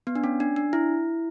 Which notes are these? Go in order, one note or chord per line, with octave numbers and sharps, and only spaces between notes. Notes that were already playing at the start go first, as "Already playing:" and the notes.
B3
D4
C#4
D4
D4
E4